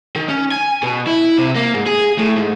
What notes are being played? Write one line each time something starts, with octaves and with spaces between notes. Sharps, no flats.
D#3
C#4
G#5
B2
E4
C3
A#3
G#2
G#4
A2
G#2